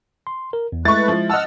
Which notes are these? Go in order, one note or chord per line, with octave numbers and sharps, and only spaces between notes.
C6
A#4
E2
G#3 A3 E4 B4 E5 C#6 A6
F3
D#5 F#5 A5 E6 F6